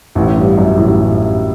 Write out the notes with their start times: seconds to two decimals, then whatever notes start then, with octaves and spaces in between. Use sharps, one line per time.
0.15 A1 A2
0.36 G2
0.58 F#2
0.77 A1 A2